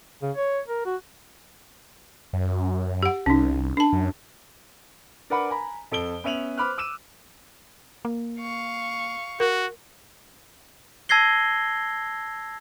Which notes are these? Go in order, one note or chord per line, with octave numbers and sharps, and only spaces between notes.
C#3
C#5
A#4
F#4
F#2
G4 F#5
C2 C#4 D#4
D4 A5
F#2
D4 A#4 B4 F#5 B5 D6
G#5 A#5 B5
F2 A4 D7 G7
B3 C#4 E5 D#7 F7 F#7
B4 C5 B5 D6 F6 F#6
D6 E6 D#7 E7
A#3
F5 C#6
F#4 A#4
A5 E6 G#6 A#6 C7 G7